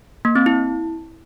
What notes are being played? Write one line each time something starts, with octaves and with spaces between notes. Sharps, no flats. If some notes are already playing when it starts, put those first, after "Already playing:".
A#3
C4
E4